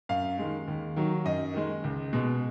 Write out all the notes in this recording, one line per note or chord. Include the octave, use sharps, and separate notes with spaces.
F#2 F5
D#3 G#3
D#2
D#3 F#3
F#2 D#5
D#3 G#3
C#2
B2 G#3